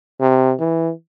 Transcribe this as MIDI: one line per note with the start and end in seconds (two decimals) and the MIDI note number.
0.21 0.54 48
0.60 0.91 52